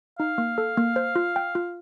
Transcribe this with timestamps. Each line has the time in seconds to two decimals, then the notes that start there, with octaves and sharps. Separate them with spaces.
0.19 D#4 F5
0.38 A#3
0.58 A4
0.77 A#3
0.96 C5
1.16 F4
1.36 G5
1.55 F4